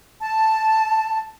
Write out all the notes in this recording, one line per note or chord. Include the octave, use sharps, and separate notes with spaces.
A5